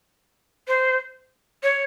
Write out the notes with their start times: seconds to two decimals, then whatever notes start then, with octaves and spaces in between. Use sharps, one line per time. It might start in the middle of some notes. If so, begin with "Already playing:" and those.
0.68 C5
1.63 C#5